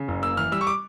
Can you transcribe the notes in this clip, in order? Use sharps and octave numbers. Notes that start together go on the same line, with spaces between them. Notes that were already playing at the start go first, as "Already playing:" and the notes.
Already playing: C#3
F#1
A#3 E6
E3 F6
G3 E6
C#6
D6